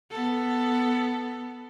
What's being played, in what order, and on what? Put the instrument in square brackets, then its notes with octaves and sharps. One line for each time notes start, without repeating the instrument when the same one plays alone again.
[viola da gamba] B3 A4